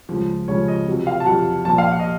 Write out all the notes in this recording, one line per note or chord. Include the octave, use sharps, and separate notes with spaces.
C#2 C#3 F3
C#2 C#3 F3 C#5
D#5
F2 C3 F#3
F5
A5
F2 C3 F#3 F#5
A#1 A#2 F3 A5
F5
F#5
D#5